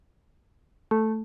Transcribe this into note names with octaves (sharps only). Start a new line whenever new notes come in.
A3